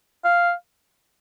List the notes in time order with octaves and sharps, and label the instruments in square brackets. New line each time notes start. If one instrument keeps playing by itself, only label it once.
[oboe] F5